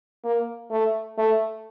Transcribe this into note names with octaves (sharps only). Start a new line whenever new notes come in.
A#3
A3
A3